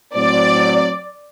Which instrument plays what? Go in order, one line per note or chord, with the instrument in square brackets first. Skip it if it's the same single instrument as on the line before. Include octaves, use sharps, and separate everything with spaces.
[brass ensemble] A2 F#3 C4 [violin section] D5